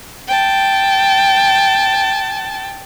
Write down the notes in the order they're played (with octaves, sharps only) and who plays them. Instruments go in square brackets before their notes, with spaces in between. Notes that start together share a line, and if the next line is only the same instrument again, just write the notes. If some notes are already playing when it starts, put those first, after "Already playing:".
[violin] G5 A5